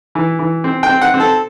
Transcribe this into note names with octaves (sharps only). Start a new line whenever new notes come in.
E3
E3
C4
G5
C4
F#5
C4
A4